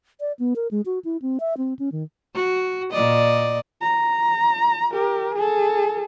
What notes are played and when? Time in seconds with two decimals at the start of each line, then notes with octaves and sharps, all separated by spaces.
0.20 D5
0.39 B3
0.56 A#4
0.71 G#3
0.86 F#4
1.05 E4
1.22 C4
1.40 E5
1.58 C4
1.79 C#4
1.92 D#3
2.35 F#4
2.91 A#2 D5 D#5
3.81 A#5
4.93 G4 A#4
5.35 G#4 A4